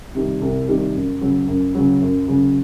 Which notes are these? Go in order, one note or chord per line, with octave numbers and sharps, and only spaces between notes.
C3 D#3 G3
C2
C3 D#3 G3
F#2
C#3 F#3
F#2
C#3 F#3
F#2
C#3 F#3